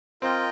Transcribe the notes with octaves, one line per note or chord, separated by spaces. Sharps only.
C4 F4 A#4 D#5 G5